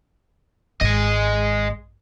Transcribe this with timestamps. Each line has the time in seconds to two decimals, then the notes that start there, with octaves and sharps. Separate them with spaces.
0.81 G#1 G#3 D#5